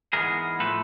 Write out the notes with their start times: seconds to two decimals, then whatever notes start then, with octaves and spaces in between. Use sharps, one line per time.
0.13 G#2 E3 G#3 B3 G#4 A#4
0.60 A2 F3 A3 A4 B4